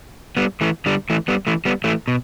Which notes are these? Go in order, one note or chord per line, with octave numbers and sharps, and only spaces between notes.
G3 B3
E3 A3
D3 G3
E3 A3
G3 B3
E3 A3
G3 B3
E3 A3
B2